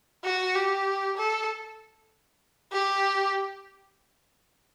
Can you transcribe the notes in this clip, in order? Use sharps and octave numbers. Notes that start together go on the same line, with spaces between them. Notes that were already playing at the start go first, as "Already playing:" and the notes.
F#4
G4
A4
G4